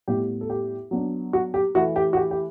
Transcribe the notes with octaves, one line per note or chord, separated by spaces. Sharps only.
A2 G3 B3 E4 G4
A4
G4
F#3 B3 D4
F#4
G4
E3 A3 E4 F#4
G4
F#4
G4
G4